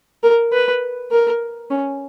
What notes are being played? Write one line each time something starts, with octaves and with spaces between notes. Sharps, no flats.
A#4
B4
A#4
C#4